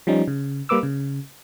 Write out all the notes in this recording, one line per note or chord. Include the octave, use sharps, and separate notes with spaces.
F3 G3 C#4 D#4
C#3
G3 A#3 B4 D6 E6
C#3